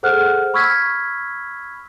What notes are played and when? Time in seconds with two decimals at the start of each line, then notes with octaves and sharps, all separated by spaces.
0.03 G#4 A4 C5 F#5 F6 F#6
0.54 B5 C#6 E6 F6 G#6 B6